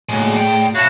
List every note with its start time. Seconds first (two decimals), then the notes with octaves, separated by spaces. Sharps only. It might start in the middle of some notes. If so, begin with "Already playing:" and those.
0.09 A2 F#3 G#3 A#3 B3
0.24 G#4 D5
0.36 G5
0.75 B2 F#4 C5 C#5 E5 F5 A5 B5